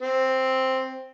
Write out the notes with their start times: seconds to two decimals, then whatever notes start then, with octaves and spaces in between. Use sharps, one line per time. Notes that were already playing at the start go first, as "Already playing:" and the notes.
0.01 C4